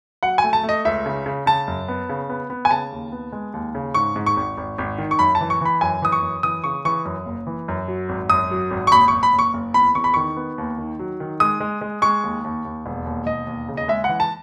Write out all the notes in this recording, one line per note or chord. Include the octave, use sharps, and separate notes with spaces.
F#3 F#5
G#5
A3
A5
A3
D#5
C#2 E5
C#3
C#3
C#3 A5
F#2
B3
C#3
B3
B3
G#5
C#3 A5
D#2
B3
G#3
D#2
C#3
G#2 C#6
G#2
C#6
G#1
G#1
G#1
D#3
C#6
F#2 B5
A5
E3
C#6
E3 B5
F#2 G#5
E3 D#6
C#6
F#2
E3 D#6
C#3 C#6
E3 C#6
F#2
F#1
E3
F#2
F#3
G#1
F#2 D#6
F#3
G#1
C#6
F#1 B5
F#1 C#6
B5
F#1
C#6
F#1
E2 B5
E2 C#6
B5
D#3 C#6
B3
D#2
D#3
F#3
D#3
G#3 D#6
G#3
G#3
G#3 C#6
D#2
D#2
D#2
E1
D#2
E1 D#5
D#2
C#3
D#5
G#3 E5
E3 F#5
A5